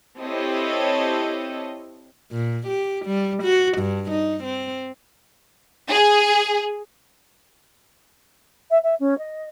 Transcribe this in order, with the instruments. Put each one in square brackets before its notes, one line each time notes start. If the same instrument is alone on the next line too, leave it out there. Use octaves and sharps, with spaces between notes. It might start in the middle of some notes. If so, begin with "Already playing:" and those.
[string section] C4 E4 G4 A4 C#5 D#5
[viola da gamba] A#2
G4
G3
F#4
G2
D#4
C4
[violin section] G#4
[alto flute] E5
E5
C#4
D#5